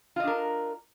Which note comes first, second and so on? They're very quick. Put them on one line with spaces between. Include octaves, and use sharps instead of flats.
F4 D#5 D4 A#4